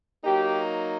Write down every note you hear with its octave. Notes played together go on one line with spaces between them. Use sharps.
F#3 A#3 D#4 G4